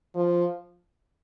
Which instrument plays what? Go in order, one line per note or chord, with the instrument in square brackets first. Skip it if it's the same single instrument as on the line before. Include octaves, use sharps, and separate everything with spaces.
[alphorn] F3